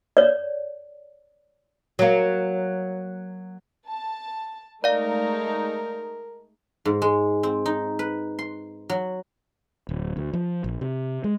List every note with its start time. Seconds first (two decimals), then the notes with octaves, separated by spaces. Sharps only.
0.17 C#5 D5
1.99 F#3 A#3
3.86 A5
4.84 G#3 A3 D#4 A#4 D5 F5
6.85 G#2
7.02 G#3
7.43 C4
7.66 D#4
7.99 B4
8.39 C6
8.90 F#3
9.89 D1
10.17 D2
10.33 F3
10.64 A#1
10.81 C3
11.24 G#3